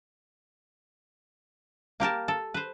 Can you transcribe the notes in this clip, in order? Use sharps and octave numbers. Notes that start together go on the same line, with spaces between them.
A#3 G4 A#4 A5
A4
B4 C5